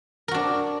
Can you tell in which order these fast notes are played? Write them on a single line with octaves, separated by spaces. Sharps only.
A#4 F#4 D4